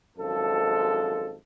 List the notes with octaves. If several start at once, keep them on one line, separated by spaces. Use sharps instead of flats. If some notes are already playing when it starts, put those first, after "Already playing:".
G#1 F#2 F3 G#3 A4